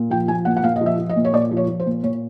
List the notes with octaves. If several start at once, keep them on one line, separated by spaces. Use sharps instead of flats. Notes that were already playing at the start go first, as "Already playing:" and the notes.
Already playing: A#2
F3 G5
F3 G#5
A#2 F#5
F#5
A#2 F5
D#5
F3
E5
F3
D#5
A#2
C#5
A#2 D5
F3
C#5
F3
C5
A#2
A#2 C#5